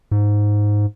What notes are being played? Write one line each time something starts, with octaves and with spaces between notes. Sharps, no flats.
G#2